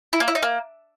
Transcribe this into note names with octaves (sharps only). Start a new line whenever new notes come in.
E4
A#3
E4
D#4
A#3